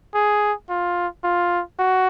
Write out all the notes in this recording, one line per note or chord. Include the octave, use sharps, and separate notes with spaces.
G#4
F4
F4
F#4